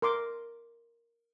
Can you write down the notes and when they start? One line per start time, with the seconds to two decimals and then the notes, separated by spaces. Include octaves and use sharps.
0.02 A#4 C6 D6